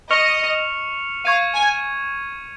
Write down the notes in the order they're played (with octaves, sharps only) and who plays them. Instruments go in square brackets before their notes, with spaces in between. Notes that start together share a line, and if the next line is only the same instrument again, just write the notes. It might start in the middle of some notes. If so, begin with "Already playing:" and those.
[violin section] D#5 [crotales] C#6 F6 C#7 F7
[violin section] F5 [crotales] C#6 G#6 D#7
[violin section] G#5